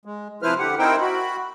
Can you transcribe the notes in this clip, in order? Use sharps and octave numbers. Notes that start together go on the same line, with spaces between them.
G#3
C3 F3 E4 B4 C5 F6
D3 G4 F#5
C4 D#4 E4 A#4 C5 G5
F#4 B5